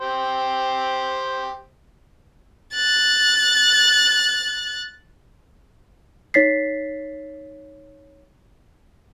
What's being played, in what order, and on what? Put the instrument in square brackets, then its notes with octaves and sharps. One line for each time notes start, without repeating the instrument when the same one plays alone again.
[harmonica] G4 C5 G5
[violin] F#6 A6
[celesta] D#4 C#5 A6 B6 C7